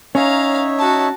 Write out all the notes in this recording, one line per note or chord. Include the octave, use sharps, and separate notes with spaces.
C#4 D#4 C#5 E5 F5 A#5
F#4 A5